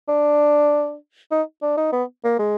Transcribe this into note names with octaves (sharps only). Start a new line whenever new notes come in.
D4
D#4
D4
D#4
B3
A#3
G#3